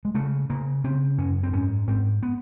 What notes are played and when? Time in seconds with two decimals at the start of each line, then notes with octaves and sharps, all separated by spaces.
0.05 G#3
0.15 C#3 A3
0.50 C#3 A#3
0.84 C#3 C4
1.18 F#2 C#4
1.43 C4
1.53 G#2 C#4
1.87 G#2 C4
2.23 B3